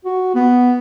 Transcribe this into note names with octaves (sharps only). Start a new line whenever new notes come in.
F#4
B3